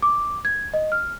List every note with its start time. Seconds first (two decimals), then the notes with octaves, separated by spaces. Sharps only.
0.02 D6
0.45 G#6
0.74 D#5
0.92 F6